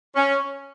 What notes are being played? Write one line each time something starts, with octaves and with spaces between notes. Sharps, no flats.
C#4